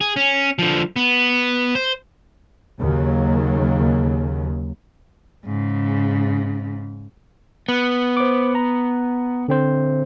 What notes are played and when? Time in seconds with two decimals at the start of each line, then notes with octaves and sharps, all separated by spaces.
0.01 G#4
0.16 C#4
0.59 D3 F3
0.96 B3
1.75 C5
2.80 D#2 C#3 F#3
5.45 G#2 C#3
7.69 B3
8.17 C5 D6
8.55 A#5
9.48 D3 C4 C5